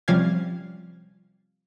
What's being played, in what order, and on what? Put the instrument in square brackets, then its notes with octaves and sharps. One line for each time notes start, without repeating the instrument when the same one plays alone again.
[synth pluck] C3 F3 G3 C#4 F5 G#6